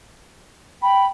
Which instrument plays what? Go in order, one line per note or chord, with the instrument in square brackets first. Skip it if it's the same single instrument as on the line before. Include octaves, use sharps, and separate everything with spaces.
[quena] G5 [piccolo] B5